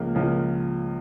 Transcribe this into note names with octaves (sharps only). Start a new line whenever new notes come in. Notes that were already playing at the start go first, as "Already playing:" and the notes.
Already playing: C#2 C#3 F3 A#3
C#2 C#3 F3 A#3